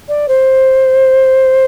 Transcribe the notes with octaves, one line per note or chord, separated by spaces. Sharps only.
D5
C5